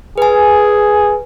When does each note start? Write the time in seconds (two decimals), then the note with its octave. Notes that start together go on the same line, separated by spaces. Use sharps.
0.18 G#4 B4 G#5